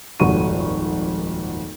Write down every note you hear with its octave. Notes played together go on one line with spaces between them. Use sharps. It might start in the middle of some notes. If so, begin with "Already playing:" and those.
D#1 G#1 F2 F#4 C#6 D#7